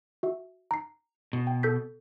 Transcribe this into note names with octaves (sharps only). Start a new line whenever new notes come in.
F#4 E5
A#5 C7
B2
G5
A4 G6 B6